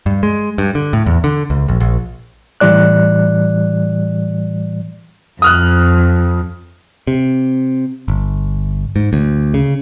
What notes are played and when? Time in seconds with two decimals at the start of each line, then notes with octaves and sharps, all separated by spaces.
0.06 G2
0.23 G#3
0.58 G2
0.75 D3
0.93 A2
1.06 E2
1.24 D3
1.50 C#2
1.68 A#1
1.80 A#1
2.60 A2 E3 G3 D5 F#6
5.42 F2 D#6 F6 F#6
7.07 C3
8.08 G1
8.96 G#2
9.13 D2
9.54 C#3